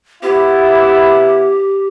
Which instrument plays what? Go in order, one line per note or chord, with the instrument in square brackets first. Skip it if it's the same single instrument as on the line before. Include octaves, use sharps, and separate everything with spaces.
[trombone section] B3 E4 [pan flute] G4